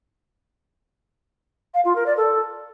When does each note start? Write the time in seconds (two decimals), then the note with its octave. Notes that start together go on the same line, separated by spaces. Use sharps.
1.74 F5
1.85 F4
1.95 A#4
2.06 D5
2.17 A4